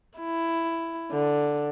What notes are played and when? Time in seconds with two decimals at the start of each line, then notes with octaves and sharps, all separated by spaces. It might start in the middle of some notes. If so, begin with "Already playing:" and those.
0.19 E4
1.12 D3